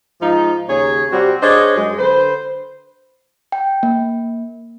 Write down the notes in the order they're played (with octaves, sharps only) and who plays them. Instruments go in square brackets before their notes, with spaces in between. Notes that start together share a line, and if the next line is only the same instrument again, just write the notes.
[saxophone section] G#2 F3 D#4 F4
D#2 C#3 G#4 C#5
C3 G3 C4 F#4
D4 G#4 C5 C#5 D#5
F#2 G#3
D3 B4 C5
[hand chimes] G5
A#3